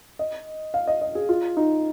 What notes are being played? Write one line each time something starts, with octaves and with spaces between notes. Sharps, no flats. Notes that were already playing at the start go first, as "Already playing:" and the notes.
D#5
F5
D#5
D#5
G#4
F4
D#4